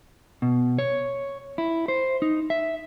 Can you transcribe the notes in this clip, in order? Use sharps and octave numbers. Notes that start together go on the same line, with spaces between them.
B2
C#5
E4
C5
D#4
E5